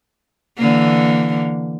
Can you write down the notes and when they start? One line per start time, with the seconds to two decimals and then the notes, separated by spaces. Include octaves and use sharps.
0.57 D3 E3 A#3